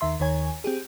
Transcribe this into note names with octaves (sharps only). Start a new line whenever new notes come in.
D#2 D#3 E5 C6
D#2 D#3 C#5 G#5
C4 G4 G#4